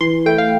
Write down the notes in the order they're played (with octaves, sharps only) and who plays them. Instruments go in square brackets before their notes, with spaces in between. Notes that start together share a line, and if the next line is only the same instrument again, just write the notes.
[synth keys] E3 C6
A3 E4 G5
F5